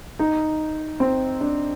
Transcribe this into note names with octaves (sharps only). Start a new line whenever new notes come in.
D#4
C4
D4